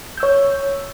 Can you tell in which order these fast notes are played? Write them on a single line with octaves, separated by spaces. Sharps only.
G6 E6 C#5